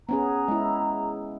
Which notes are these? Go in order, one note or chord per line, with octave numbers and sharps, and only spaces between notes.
B3 C#4 G#4 A#5
G#3 E4